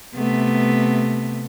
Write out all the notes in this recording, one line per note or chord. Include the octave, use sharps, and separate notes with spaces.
C3 A3 B3